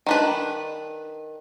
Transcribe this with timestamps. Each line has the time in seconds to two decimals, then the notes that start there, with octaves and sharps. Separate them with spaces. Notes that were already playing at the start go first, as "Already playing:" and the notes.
0.06 D#3 D4 B4